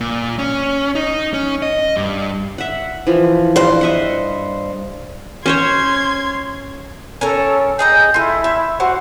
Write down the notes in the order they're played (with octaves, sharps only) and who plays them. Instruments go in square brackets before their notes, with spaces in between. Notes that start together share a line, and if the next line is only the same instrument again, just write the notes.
[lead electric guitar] A#2
C#4
D#4
C#4
D#5
G2
[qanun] E5 F#5
E3 F3
[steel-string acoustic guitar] G2 C5
[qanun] D#5 E5 F#5
[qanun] C#4 C5 C#5 [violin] C6 G#6
[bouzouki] C#4 A#4 C#5 [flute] A4
[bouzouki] G#4 D#5 A#5 [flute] G6
[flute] E4 [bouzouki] F4 A4
[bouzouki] E5
[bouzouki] A3 F#4 C5 [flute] F#5